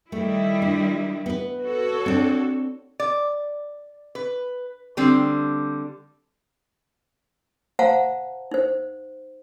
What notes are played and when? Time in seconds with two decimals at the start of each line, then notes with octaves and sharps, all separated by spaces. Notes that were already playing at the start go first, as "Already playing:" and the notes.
0.12 D#3 G3 A3 E4
0.62 D4
1.26 B3 B4
1.65 F#4 A4 C#5
2.06 C4 D4
3.00 D5
4.15 B4
4.97 D3 G3 C4 D4
7.79 C5 F5 F#5 A5 A#5
8.51 D#4 C5